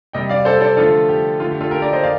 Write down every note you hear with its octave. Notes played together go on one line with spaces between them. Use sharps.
C3 G3 D#5 G5
D5 F5
A4 C5
A4 C5
D3 F3 A3 F4 A4
G4
D3 A3 F4
G4
F4 A4
G4 A#4
A#4 D5
C5 D#5
D5 F5